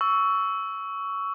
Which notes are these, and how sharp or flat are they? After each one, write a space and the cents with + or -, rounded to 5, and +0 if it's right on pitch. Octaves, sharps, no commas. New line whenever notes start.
C#6 +15 E6 +0